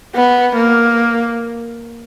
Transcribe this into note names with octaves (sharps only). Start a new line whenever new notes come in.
B3
A#3